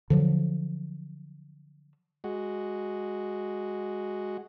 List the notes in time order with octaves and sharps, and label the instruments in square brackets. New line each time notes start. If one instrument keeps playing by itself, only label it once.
[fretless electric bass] D3 F3 F#3
[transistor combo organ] G#3 F#4